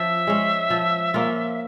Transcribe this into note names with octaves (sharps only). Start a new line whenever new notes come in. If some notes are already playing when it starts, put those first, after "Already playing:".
Already playing: F3 C#4 E5
G#3 C#4
F3
A#3 C#4 F4